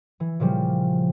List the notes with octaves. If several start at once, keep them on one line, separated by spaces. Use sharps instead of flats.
E3
A#2 C#3 F3 G3